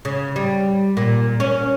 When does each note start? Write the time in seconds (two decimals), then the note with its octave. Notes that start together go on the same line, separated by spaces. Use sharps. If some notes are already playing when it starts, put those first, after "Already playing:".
0.05 C#3
0.36 G3
0.97 A#2
1.40 C#4